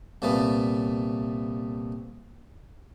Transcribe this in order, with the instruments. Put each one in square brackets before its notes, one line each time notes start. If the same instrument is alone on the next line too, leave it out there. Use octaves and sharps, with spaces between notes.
[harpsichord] C2 A#2 A3 B3